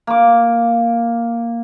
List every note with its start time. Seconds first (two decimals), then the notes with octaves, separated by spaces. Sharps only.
0.07 A#3 D6